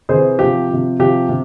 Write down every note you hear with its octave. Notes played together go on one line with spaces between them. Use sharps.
C3 E3 G#4 C5
C3 F3 G4
C3 F3
C3 F3 G4
C3